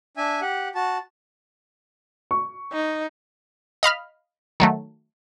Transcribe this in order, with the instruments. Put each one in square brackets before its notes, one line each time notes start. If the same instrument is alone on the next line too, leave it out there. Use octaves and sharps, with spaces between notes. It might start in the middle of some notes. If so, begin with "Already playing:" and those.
[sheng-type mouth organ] D4 E5 G#5
G4 F#5
F#4 A5
[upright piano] C#6
[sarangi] D#4
[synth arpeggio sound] D#5 F5 B5 F6
D#3 F#3 A3